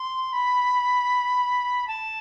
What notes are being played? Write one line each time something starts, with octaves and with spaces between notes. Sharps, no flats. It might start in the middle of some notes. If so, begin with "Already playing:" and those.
Already playing: C6
B5
A5